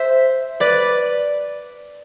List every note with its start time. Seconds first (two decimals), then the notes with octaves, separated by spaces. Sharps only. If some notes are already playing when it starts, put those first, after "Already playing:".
Already playing: C5 E5
0.60 B4 D5